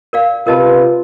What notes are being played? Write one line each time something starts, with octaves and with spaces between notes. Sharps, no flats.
A#4 D5 F5
C3 F4 A#4 B4 D#5 A5